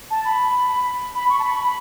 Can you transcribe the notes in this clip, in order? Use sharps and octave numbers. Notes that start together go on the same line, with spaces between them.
A5
B5
B5
C#6
A5
B5
B5